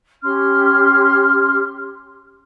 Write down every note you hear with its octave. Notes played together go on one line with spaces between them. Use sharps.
C#4 G4 C6 F6